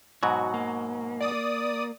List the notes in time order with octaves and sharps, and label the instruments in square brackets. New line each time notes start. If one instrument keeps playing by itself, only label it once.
[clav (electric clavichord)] G#2 B2 F#3 [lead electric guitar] F#4
[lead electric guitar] A#3
[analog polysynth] D5 D#6